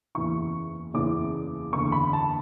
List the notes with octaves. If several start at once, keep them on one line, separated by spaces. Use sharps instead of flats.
F#1 E2 C#3 E3 C#6
F#1 E2 C#3 E3 D6
F#1 E2 D3 C#6
B5
A5